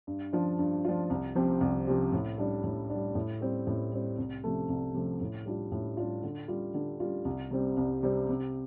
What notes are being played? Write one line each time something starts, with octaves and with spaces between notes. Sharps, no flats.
G2
F3 D4 F4
G2
F3 D4 F4
C2
C3 F3 C4 G4
C2
C3 F3 C4 G4
A2
G3 D4
A2
G3 D4
A2
G3 C4
A2
G3 C4
C2
C3 F3 A3
C2
C3 F3 A3
A2
G3 D4 F4
A2
G3 D4 F4
D3
G3 F4
D3
G3 F4
C2
C3 G3 C4
C2
C3 G3 C4
C3